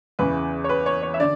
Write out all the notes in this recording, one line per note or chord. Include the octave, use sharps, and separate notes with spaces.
E2 C#3 E3 B4
C#5
B4
C#5
C#5
E5
D3 D5